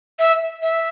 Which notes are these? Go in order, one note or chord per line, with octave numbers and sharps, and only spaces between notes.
E5
E5